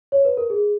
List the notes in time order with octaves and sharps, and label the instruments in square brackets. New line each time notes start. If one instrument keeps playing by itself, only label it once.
[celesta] C#5
B4
A#4
G#4